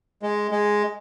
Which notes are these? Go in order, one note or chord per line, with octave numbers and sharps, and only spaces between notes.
G#3
G#3